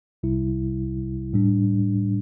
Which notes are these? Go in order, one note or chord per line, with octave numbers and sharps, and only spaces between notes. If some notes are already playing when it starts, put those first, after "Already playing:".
C2 C3 G3 E4
A2 G3 D4